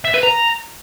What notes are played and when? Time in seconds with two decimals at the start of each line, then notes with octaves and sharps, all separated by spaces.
0.05 E5
0.14 B4
0.23 A#5